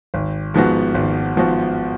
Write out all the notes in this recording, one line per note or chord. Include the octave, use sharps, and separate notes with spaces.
G#1
G#2 F3 B3 F#4
G#1
G#2 F3 B3 F#4